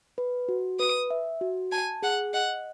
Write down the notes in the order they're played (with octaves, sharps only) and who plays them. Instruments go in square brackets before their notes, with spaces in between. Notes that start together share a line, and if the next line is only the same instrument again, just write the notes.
[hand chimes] B4
F#4
[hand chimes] B4 [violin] D#6
[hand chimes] E5
F#4
[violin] G#5 [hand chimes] A5
[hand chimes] G#4 [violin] F#5
[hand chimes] D#5 [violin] F#5